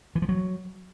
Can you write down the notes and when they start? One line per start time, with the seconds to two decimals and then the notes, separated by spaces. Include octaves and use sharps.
0.15 E3
0.22 F3
0.29 F#3